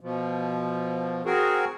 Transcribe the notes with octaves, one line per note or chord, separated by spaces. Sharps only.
B2 F3
C4 F#4 G#4 A#4